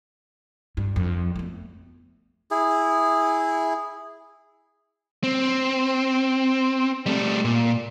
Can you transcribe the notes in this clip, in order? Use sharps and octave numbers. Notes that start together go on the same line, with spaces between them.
G2
F2
A3 B3
E4 G#4
C4
G3 A3
A#2